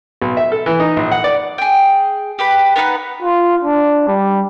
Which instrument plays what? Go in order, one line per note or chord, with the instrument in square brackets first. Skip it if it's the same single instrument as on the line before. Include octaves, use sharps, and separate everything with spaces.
[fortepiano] B1
E5
A4
E3
D#4
A#1
F#5
D5
[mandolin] G#4 G5
G4 B4 B5
B3 D#4 B4 F#5
[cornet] F4
D4
G3